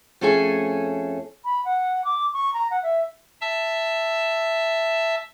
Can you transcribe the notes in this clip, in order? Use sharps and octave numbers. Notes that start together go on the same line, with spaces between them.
F2 A3 C#4 G#4 A4 G#5
B5
F#5
D6
C#6
A#5
F#5
E5
E5 A5 E6